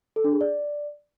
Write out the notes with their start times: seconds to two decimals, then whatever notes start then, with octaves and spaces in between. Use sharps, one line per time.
0.16 A4
0.24 D4
0.33 G#4
0.41 D5